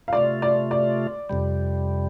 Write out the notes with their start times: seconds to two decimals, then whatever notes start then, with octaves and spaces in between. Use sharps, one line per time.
0.08 F5
0.13 C3 A3 F4 D5
0.42 D5
0.71 D5
1.30 F2 C3 G3